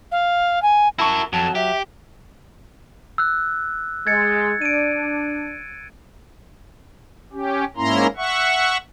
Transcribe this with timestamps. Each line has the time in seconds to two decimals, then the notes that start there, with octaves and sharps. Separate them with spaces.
0.12 F5
0.62 G#5
0.99 E4 F#4 A#4 A5 C#6
1.33 F2 F#3 A5
1.55 G4 E5
3.18 E6 F#6
4.07 G#3 G#6 A6 C#7
4.62 D4 D7 D#7
7.32 C#4 G4
7.77 G#2 A#3 C#4 E4 A#5 C6
8.17 E5 F#5 C#6